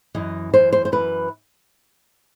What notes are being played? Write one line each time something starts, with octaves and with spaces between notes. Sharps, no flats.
F#2 E3 D#5
F#2 E3 C5
C5
C5
F#2 E3 B4